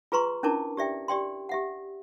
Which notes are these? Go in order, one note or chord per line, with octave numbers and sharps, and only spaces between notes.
F4 G#4 B4 A#5 C6 C#6
C#4 D4 E4 A#4 A5 D6
G4 D5 E5 G5
G4 D5 G5 C6
G4 E5 F#5